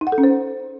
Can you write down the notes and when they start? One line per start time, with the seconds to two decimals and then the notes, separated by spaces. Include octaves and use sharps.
0.01 D#4
0.07 F#5
0.12 A4
0.18 C#4
0.23 C5